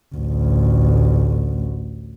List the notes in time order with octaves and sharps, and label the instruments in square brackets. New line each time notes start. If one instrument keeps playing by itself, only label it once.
[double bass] A1 D2